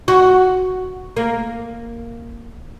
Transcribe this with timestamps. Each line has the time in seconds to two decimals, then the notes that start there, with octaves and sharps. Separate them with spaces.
0.08 F#4
1.16 A#3